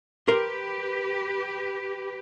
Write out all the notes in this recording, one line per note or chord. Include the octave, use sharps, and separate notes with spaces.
G4 A#4 B4 C6